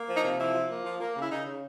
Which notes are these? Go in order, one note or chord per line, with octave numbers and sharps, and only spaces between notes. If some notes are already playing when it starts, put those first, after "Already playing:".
Already playing: A#3
F3
D#4
C3
F3 E4
F3
A#3
F3
A#3
C#3 E4
C#3 D#4
C#3